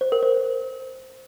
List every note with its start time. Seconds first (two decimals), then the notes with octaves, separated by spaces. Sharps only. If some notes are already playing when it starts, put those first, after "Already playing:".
0.01 C5
0.12 A#4
0.23 C5